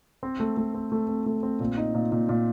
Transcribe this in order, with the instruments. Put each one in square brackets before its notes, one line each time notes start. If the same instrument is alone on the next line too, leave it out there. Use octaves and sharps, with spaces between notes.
[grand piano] C4
A3
A3
C4
A3
C4
A3
C4
A#2
D#4
A#2
A#2
A#2